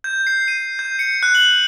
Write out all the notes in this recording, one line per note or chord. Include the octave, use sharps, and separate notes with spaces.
G6
C7
D#7
G6
C#7
F#6
F#7